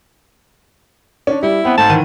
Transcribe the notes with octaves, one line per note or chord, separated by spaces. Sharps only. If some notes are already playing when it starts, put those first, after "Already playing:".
C#4 D4
G3 E4
B3 C4
G#2 A3 A5
D#3 E3 D#7